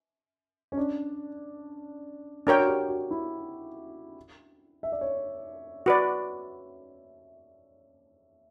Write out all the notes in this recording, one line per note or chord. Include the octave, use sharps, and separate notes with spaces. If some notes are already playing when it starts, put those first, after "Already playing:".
C#4
D4
D4 F#4 A#4 C#5 G5
F#4
G4
F#4
E4
E5
D5
C#5
F#4 B4 D5